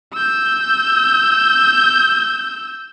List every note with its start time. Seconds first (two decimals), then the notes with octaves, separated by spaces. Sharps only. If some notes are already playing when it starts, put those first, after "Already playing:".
0.14 E6 G6